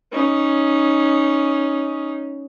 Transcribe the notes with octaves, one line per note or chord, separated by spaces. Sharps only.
C#4 D#4